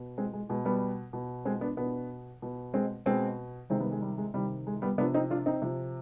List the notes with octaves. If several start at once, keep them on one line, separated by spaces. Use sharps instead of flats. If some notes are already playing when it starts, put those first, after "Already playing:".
Already playing: B2
G#3 C4
G#3
B2 G#3
G3 B3
B2
G#3 C4
B3 D4
B2 B3 D4
B2
G#3 C4
B2 G#3 C4
C3 D#3 G#3 C4
G3 B3
G#3
G3
G#3
C3 D#3 G3
G#3
G3 B3
C3 F3 B3 D4
C4 D#4
D4 F4
C4 D#4
C3 F3